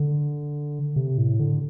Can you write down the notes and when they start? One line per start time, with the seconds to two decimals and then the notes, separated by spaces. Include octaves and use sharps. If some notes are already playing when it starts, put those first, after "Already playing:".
Already playing: D3
0.96 C3
1.18 A2
1.39 D3